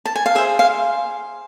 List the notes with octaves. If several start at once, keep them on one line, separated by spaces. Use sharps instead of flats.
A5
G#5
F5
G#4 C5 E5
F5